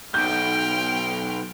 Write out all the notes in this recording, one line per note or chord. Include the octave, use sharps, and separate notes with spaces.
B1 G5 F6 G6